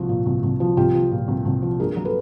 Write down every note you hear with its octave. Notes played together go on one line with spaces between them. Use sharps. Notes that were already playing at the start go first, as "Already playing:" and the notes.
Already playing: C2 F3 F#4
A#2
C2
C2
F3
C2 F4 G4
F3
A#2
C2
C2
F3
G2 G#4 A#4
F#3
A4 B4